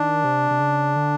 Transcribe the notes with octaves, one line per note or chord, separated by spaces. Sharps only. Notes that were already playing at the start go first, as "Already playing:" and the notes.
Already playing: D#3 D4
C3
C3
C#3
D3